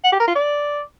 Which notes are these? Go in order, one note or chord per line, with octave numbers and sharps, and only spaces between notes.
F#5
G4
A#4
F4
D5